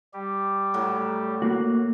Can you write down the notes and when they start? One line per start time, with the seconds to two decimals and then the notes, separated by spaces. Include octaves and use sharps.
0.14 G3 G4
0.74 A2 F#3
1.42 A#3 F#4